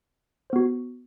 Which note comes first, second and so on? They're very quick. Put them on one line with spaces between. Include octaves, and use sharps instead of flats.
C5 B3 F#4